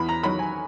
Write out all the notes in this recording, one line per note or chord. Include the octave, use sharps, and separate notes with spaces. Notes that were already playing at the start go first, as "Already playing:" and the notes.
Already playing: E2 B5
A#5
D#3 F#3 B5
G#5